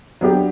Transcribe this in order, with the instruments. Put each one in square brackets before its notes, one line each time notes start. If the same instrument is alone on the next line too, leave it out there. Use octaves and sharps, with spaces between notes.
[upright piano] F#3 B3 D4 G4